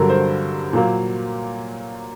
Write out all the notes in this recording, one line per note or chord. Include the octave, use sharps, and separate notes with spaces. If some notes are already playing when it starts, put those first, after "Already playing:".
Already playing: G2 D3 F#3 A#4
C5
A#2 F#3 A#3